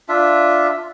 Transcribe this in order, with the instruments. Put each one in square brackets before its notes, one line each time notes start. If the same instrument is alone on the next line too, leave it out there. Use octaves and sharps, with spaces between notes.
[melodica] D4 F4 E5